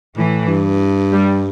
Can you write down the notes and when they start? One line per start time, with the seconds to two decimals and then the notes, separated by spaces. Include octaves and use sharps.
0.16 A2 E3
0.48 G2
1.13 G3